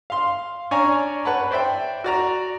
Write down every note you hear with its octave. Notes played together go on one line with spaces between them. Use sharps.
F5 C6
C#4 D4 C#5 D5 G#5 A#5
B4 C#5 F#5 A5 B5
C5 D5 E5 G5
F#4 D5 A#5